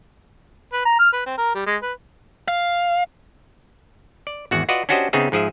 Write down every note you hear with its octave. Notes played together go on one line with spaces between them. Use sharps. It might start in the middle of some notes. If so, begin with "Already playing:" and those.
B4
A#5
F6
B4
C4
A#4
G3
G#3
B4
F5
D5
G#1 E2 F#4 F#5
F4 F#4 B4 D5 D#5
C#4 D4 F#4 G4 C5 D#5
C#3 B3 C4 D#4 G#4 E5
G#2 F3 G#4 E5